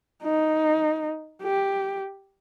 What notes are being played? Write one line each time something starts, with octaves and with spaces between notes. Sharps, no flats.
D#4
G4